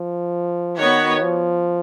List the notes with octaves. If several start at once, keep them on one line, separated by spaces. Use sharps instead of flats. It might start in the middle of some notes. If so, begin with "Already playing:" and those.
Already playing: F3
D#3 B3 F#4 C#5
F3